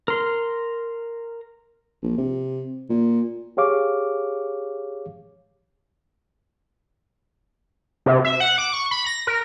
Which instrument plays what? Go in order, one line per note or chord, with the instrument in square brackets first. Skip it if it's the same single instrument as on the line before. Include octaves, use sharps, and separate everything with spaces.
[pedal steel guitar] A#4 C6
[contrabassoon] A#1
C3
A#2
[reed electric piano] G4 G#4 C#5 F5 D6
[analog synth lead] C3
E5
F#5
D6
C#6
B5
A#6
A#4